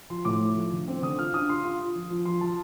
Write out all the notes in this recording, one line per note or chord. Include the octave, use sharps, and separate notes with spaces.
F3 C6
A2 D6
A3
F3
D3
C4
D3 D#6
F4 F6
D4 D#6
F4 C6
F4
F4
F3
F3
F3 C6
F3 A5